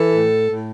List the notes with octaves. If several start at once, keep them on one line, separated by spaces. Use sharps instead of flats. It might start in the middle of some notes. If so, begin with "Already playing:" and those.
Already playing: E3 A4
A2
A2